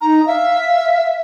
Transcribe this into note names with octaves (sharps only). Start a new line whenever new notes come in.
D#4 A#5
E5 F5